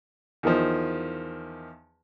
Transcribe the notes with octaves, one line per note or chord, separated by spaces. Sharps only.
E2 D#3 F3